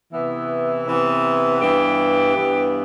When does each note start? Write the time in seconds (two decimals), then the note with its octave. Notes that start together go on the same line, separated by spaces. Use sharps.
0.12 C3 E3 B3 E4
0.87 C3 E3 B3
1.61 G2 E3 B3 G4
2.35 G2 E3 B3